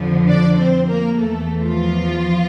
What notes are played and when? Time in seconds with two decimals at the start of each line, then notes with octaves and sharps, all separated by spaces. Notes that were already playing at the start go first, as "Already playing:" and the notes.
Already playing: F2 D3 F3
0.27 D4 D5
0.57 C4 C5
0.88 A#3 A#4
1.17 E2 E3 A3 A4
1.62 F3 F4